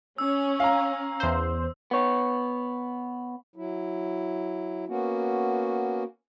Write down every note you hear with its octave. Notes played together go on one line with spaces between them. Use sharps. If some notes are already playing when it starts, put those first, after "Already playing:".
C#4 E6
F5 A#5
E2 C5
B3 C#5
F#3 E4
A#3 B3 C#4 F#4